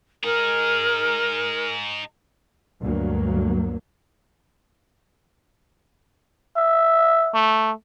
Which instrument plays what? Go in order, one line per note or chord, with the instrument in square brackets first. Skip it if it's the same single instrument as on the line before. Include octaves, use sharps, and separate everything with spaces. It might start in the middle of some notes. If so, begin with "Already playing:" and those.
[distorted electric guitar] D#4 G#4 [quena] A#4
[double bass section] D2 G2 F#3 A#3
[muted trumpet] E5
[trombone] A3